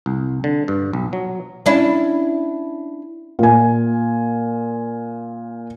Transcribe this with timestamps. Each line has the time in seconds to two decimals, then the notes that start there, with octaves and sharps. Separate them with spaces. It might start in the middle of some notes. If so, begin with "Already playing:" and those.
0.06 C2
0.44 D3
0.68 G2
0.93 B1
1.13 F#3
1.66 C#4 D4 E4
3.39 A#2 G#5